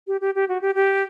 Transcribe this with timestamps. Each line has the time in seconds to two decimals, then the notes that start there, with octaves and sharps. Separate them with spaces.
0.07 G4
0.21 G4
0.35 G4
0.49 F#4
0.62 G4
0.75 G4